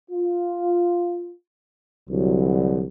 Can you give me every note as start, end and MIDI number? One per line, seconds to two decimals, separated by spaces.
0.11 1.32 65
2.10 2.86 36
2.10 2.86 50
2.10 2.86 54